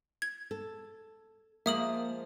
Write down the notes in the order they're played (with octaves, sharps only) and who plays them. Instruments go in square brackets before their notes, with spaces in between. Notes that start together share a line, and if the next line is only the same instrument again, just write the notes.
[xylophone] G#6
[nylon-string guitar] A4
[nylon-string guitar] F3 G#3 [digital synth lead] A#3 [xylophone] E5 D#6 F#7